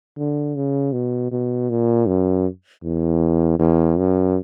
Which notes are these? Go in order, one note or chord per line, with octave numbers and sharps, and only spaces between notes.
D3
C#3
B2
B2
A#2
F#2
E2
E2
F#2